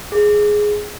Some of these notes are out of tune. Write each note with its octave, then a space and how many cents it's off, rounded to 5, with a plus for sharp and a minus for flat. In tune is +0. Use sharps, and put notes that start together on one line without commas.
G#4 +5